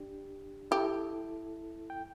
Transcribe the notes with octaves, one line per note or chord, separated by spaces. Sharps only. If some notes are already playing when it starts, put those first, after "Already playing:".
Already playing: D4 G4
E4 G4 A4
G5